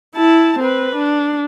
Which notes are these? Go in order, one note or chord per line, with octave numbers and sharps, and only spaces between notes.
E4 A5
C4 B4
D4